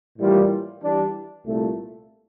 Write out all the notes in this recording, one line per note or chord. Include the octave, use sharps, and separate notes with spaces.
A2 E3 G3 A#3 F4
E3 G3 D4
C2 A#2 A3